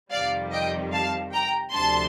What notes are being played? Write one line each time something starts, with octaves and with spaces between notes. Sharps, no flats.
F2 C3 D#3 G3 D5 F5
D#5 G5
F5 A5
G5 A#5
D2 C3 F3 A3 D4 A5 C6